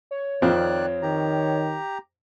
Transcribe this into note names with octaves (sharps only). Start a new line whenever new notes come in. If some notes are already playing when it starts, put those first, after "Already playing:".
C#5
F2 D#3 C4 D5 F#6
D#3 G4 A#5